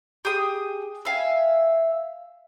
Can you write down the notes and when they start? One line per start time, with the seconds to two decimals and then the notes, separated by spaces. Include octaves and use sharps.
0.25 G4 G#4 D#6
1.05 E5 F5 G#5